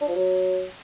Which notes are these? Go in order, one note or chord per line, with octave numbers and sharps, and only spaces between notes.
D4
F3
F#3